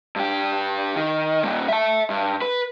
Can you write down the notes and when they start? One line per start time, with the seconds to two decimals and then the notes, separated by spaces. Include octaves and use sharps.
0.16 G2 G4
0.96 D#3
1.44 A#2 G3
1.68 E5 A5
2.10 G2
2.42 B4